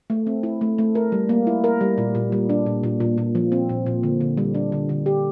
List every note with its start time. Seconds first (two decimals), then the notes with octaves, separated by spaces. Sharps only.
0.10 A3
0.27 C4
0.43 E4
0.61 A3
0.78 A3
0.95 A#4
1.12 G3
1.29 A#3
1.47 E4
1.64 A#4
1.81 G3
1.98 A#2
2.15 A#2
2.32 G3
2.49 D4
2.66 A#2
2.83 A#2
3.00 A#2
3.18 A#2
3.35 F3
3.52 C4
3.69 A#2
3.86 A#2
4.03 D3
4.21 D3
4.37 G3
4.55 D4
4.72 D3
4.89 D3
5.06 G4